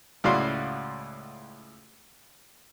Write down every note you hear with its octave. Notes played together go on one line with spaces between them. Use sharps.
C#2 A2 F#4 D5 F5 C6